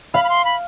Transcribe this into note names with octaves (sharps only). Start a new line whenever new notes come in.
F5 B5
B5
C6
B5